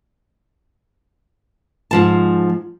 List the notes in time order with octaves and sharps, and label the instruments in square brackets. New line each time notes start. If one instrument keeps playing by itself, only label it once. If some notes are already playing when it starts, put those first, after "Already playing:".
[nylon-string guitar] G#2 F3 A5